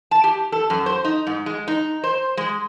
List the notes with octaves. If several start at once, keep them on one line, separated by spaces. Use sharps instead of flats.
A5
G4
A4
F#2
C5
D#4
G#2
G#3
D#4
C5
G#3